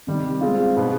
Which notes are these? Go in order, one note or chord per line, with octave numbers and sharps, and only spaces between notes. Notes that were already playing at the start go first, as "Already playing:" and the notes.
C3 D#3 G3
G#3 C4 F4
B2 B3 D#4 G#4